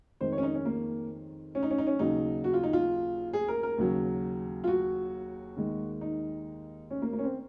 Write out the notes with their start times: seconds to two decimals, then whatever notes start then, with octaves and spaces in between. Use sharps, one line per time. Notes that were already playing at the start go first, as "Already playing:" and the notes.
0.21 F2 D#3 G#3 C5
0.32 C#5
0.38 C#4
0.43 D#4
0.54 C#4
0.65 A#3
1.55 C#4
1.63 D#4
1.70 C#4
1.78 D#4
1.87 C#4
1.99 D#2 C#3 F#3 D#4
2.44 F#4
2.53 F4
2.63 D#4
2.73 F4
3.33 G#4
3.48 A#4
3.63 A#4
3.78 D#2 C#3 F#3
4.64 F4
4.67 F#4
5.57 D#2 D#3 G#3
6.01 D#4
6.91 C#4
7.02 A#3
7.13 A#3
7.19 C#4
7.24 C4